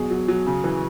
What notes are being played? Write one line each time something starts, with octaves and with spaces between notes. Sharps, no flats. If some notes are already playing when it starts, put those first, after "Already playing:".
Already playing: B2 F#3 G#4
F#3
F#3
C#3
E3